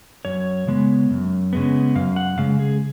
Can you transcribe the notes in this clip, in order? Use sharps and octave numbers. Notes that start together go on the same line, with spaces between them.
F#2 C#5
C#3 G#3 B3
F#2
C#3 G#3 B3
F#2 F5
F#5
C#3 G#3 F5
G#4